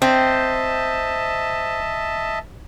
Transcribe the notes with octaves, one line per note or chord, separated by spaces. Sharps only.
C4 D#5 E5 A5